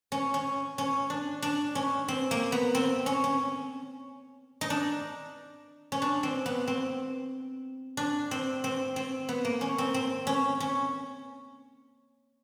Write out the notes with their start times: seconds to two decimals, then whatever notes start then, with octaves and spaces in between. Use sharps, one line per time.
0.12 C#4
0.34 C#4
0.78 C#4
1.10 D4
1.42 D4
1.75 C#4
2.08 C4
2.31 A#3
2.52 B3
2.75 C4
3.06 C#4
3.24 C#4
4.61 D#4
4.70 D4
5.92 C#4
6.02 D4
6.23 C4
6.46 B3
6.68 C4
7.97 D4
8.31 C4
8.64 C4
8.96 C4
9.29 B3
9.45 A#3
9.61 C#4
9.78 C4
9.94 C4
10.27 C#4
10.60 C#4